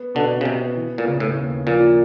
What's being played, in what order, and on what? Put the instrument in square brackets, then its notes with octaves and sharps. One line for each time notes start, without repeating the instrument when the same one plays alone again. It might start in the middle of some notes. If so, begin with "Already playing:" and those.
Already playing: [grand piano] B3
[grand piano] B2 [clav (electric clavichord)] D3
[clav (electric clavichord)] C#3
[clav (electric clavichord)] C3 [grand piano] B3
[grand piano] E3
[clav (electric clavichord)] A#2
[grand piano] C#3
[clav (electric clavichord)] A2
[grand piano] D#2
[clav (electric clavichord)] A#2 [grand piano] F3